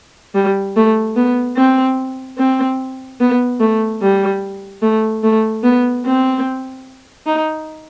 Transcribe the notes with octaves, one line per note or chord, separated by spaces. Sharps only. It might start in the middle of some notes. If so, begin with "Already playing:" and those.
G3
A3
B3
C4
C4
B3
A3
G3
A3
A3
B3
C4
D#4